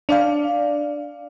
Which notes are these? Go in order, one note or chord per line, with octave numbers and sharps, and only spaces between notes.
D4 D5 F5